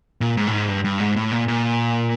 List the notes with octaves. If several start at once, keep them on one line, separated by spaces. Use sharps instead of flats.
A#2
G#2
A2
G#2
G2
G2
G#2
A2
A#2
A#2